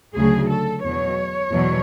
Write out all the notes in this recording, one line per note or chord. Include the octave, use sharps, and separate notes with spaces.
D2 C#3 F#3 G#4
A4
E2 B2 F#3 C#5
E2 B2 F#3